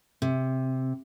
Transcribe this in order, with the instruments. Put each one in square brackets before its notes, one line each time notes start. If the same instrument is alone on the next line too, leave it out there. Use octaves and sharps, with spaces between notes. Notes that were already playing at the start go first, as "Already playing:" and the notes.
[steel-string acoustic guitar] C3